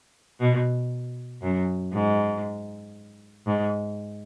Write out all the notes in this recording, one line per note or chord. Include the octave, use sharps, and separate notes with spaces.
B2
F#2
G#2
G#2